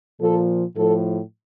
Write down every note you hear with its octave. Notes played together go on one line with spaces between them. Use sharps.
A#2 F3 A4
A2 F3 A4